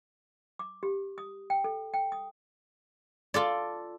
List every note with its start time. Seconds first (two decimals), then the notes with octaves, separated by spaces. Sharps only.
0.59 D6
0.83 G4
1.18 D#6
1.50 G5
1.64 A4
1.94 G5
2.12 D#6
3.34 F4 A4 D5